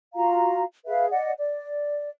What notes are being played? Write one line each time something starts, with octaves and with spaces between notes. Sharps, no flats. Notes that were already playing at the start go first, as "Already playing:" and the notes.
F4 F#4 F5 A#5
G#4 B4 E5 F5
D5 D#5 F#5
D5